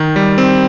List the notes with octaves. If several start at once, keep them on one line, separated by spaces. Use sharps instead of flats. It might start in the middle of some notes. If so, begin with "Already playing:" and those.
Already playing: D#3
G3
C4